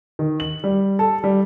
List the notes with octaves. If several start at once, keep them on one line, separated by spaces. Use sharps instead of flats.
D#3
F#7
G3
A4
G3